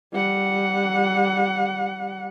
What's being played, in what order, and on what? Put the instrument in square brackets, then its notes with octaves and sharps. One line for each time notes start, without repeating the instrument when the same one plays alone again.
[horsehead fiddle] G3 F#5